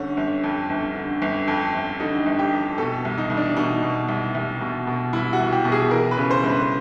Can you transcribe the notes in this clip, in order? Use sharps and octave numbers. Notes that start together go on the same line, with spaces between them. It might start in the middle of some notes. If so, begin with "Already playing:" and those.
Already playing: G1 D3 C#4
G1
F2
G1
D3
G1
F2
G1
D3 D#4
G1
G4
F2
B2 A4
C2
D#4
C2
D4
B2 D#4
B2
C2
C2
B2
B2
C2 E4
F#4
C2
G4
B2
G#4
E3 A#4
B4
C#3
C5
G1
B4